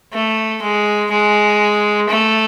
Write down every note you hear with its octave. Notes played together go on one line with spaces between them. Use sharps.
A3
G#3
G#3
A3